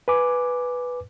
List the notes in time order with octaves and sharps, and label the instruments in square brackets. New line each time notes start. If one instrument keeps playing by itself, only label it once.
[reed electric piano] B4 G#5 D6